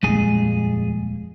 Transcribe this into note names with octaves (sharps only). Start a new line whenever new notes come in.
D#1 F2 A#2 G#3 G#4